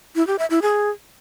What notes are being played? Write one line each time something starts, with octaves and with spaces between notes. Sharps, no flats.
E4
G4
E5
E4
G#4